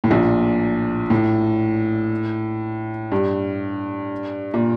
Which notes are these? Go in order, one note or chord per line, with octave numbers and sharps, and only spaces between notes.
A2
A#1 A#2
A2
G2
A#2